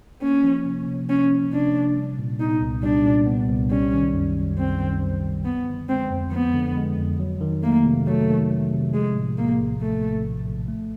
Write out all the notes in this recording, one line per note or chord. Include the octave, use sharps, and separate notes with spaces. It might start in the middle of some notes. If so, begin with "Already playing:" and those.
A#3 C#4
F3
C3
C3
A#3 C#4
F3
C3 D4
C3
G3
A#2
B3 D#4
C2
G3 D4
A#2
B3
C2
G3 C#4
D#3
F#2
F#2
G3 C4
D#3
F#2
F#2
F3 B3
D3
G#3 C4
F2
F3 B3
D3
G#3
F2
F#3
D#3
A3 A#3
C3
F#3 A3
D#3
A3
C3
F3 G#3
A2
A#1 A#3
A#1
F3 A3
A2
A#1
A#1
A3